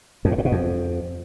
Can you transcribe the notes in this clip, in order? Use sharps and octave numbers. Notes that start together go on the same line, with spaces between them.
F2
G#2
A2
B2
F2